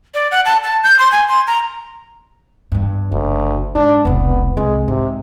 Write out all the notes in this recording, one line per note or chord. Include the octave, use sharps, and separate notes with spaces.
D5
F#5
A5
A5
G6
C6
G#5
C6
A#5
E2 G2
F#1 D2
G#2 D4
E1 C2 B3
C2 G#3
G#2 C3